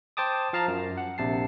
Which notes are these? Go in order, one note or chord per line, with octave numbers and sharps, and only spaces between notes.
C5 G5 A5 D6 D#6
F3 F5 A5 A#5
F#2
F#5
A#1 C3 A5 C7